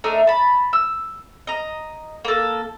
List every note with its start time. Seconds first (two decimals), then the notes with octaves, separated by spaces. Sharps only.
0.04 A3 D4 D#4 A#4
0.27 A5 B5
0.73 E6
1.47 D#5 A#5
2.25 A#3 A4